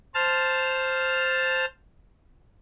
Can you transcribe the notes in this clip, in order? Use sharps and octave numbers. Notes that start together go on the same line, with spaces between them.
C5 A5 F6